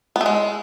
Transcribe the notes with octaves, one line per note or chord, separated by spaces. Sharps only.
B3
A3
G#3